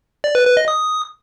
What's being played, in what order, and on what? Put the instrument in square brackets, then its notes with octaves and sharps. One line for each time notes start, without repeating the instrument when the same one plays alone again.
[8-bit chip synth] D5
B4
B4
D#5
D#6